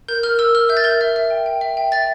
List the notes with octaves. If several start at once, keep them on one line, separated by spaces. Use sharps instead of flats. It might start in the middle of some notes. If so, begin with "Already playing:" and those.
A#4 G6
A#4 F6
A#4 E6
A#4 F6
E5 G6
A6
A#4 G6
E5
E5
G5
G5
E5
G5
E5 A6